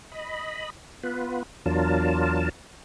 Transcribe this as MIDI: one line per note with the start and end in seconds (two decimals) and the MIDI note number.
0.12 0.70 75
0.12 0.70 83
1.03 1.43 59
1.03 1.43 65
1.03 1.43 71
1.66 2.49 40
1.66 2.49 54
1.66 2.49 62
1.66 2.49 65
1.66 2.49 70
1.66 2.49 81